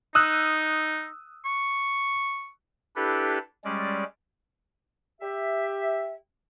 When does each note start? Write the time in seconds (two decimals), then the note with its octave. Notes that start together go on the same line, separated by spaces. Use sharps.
0.15 D#4 D#6 E6 F#6
1.45 C#6
2.96 D4 E4 G4 A4 B4
3.65 G3 G#3 C#4 D5
5.21 G4 E5